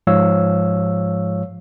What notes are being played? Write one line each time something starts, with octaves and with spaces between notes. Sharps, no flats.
G#2 F3 G#3 C#5 F5 E6